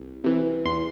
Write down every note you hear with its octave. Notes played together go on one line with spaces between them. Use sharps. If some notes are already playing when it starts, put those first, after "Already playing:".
Already playing: C2
C3 E3
E2 C6